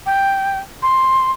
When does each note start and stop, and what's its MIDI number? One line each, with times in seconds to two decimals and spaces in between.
0.06 0.58 79
0.82 1.31 84